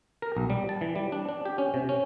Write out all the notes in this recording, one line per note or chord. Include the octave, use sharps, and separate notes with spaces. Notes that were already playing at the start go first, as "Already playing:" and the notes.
A#4
B1
G3
A5
E3
G3
D4
D4
G4
C#4
C3
C#4